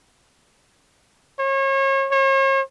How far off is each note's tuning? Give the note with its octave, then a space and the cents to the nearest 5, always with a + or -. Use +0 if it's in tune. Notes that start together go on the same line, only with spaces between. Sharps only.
C#5 -35
C#5 -40